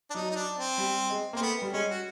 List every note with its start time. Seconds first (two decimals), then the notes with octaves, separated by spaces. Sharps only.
0.10 D4
0.15 F#3 D#4
0.31 D#4
0.35 D4
0.57 C4
0.78 G3
1.10 G#3
1.33 A#3
1.36 C4
1.41 A3 B3
1.62 G3
1.73 G#3 C#4
1.90 F#4